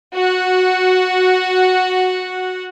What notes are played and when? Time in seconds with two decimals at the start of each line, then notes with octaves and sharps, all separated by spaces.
0.13 F#4 F#5